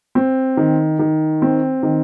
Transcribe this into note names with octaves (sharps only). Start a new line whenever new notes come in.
C4
D#3
D#3
C4
D#3